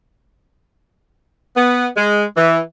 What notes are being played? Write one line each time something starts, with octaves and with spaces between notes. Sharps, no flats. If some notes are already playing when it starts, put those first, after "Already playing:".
B3
G#3
E3